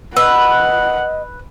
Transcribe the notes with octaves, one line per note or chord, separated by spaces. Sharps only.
B4 D#5 F#5 E6